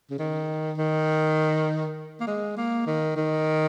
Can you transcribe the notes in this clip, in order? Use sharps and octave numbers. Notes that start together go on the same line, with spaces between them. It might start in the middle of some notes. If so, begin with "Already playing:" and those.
C#3
D#3
D#3
A#3
G#3
A#3
D#3
D#3